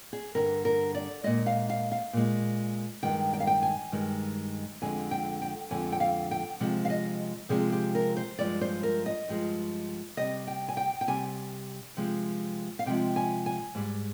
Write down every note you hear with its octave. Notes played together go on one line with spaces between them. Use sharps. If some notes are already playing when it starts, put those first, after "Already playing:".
G#4
G2 D3 G3 A#4
A#4
D5
A#2 G#3 D#5
F5
F5
F5
A#2 G#3
G2 D#3 G#3 G5
G5
F5
G5
G#5
G2 D#3 G#3
F2 D3 G#3 G#5
G5
G5
F2 D3 G#3 G#5
G5
F5
G5
C3 F3 G#3
F5
D#5
C3 F3 G#3 G#4
G4
A#4
C5
G2 F3 G#3 D5
C5
A#4
D#5
G2 F3 G#3
C3 G3 D#5
G5
G#5
G5
G5
C3 G3 G#5
C3 F3 G#3
F5
C3 F3 G#3 G5
G#5
G#5
G#2 G3